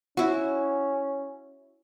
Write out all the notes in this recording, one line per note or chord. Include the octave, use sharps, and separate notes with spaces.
C#4 E4 F#4